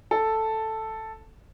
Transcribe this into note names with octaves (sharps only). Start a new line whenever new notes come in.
A4